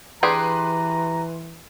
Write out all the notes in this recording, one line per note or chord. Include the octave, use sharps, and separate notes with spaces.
E3 D4 G4 G#4 B4 A#5 C6 C7